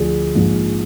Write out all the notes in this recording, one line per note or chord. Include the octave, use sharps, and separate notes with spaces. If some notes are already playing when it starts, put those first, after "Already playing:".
Already playing: D2 D3 F3 G#4
A#1 G#2 F3